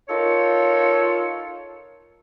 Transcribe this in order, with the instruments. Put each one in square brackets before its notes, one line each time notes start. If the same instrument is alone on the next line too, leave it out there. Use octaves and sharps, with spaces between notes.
[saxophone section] D#4 F4 A4 A#4 C#5